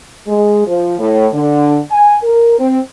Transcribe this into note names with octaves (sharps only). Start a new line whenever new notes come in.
G#3
F3
A2
D3
G#5
A#4
C4